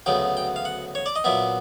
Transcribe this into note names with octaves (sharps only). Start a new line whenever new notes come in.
D2 C#3 F#3 B3 G5
G5
F5
F#5
C#5
D5
D#5
A#2 F#3 B3 E5